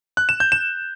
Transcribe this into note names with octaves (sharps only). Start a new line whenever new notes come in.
F#6
E7
G6
E7